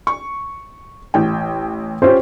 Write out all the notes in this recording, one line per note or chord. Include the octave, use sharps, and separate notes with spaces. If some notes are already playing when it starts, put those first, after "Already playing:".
C#6
A1 G5
C#4 F4 G4 C5